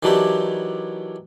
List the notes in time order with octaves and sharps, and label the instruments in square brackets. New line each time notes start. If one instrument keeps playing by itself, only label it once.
[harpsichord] D#3 E3 F#3 D4 E4 G4